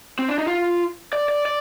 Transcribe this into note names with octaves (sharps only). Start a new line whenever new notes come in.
C4
D4
D#4
F4
D5
D5
D5